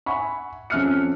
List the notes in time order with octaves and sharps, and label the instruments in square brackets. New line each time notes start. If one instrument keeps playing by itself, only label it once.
[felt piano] E5 F#5 G#5 B5 C#6
F2 C#4 E5 F6 F#6 C#7